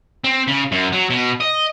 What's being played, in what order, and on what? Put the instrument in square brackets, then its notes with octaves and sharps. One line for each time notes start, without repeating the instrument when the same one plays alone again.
[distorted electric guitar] C4
C#3
F#2
F#3
B2
D#5